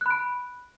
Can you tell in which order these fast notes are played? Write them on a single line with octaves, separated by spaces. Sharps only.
F#6 B5 D7